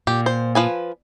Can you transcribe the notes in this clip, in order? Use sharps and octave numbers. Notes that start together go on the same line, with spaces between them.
A#2 G4
C5
F3 B4 G#5